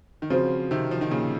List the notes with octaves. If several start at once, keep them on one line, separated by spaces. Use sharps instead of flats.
D#3
C#3 F3 C4 F#4 C5
C3 D#3
F3
D#3
A#2 C#3